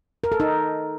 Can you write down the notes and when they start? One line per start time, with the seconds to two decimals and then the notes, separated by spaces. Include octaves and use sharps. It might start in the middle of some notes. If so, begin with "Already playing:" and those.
0.24 A#4
0.32 A4
0.40 D#4